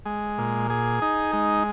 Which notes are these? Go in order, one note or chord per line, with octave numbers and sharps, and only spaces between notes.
G#3
A#2
G#4
D#4
G#3